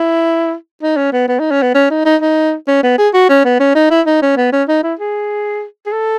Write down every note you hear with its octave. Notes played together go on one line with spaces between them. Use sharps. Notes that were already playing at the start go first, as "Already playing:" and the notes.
Already playing: E4
D#4
C#4
B3
B3
D#4
C#4
B3
C#4
D#4
D#4
D#4
C#4
B3
G#4
F#4
C#4
B3
C#4
D#4
E4
D#4
C#4
B3
C#4
D#4
E4
G#4
G#4
A4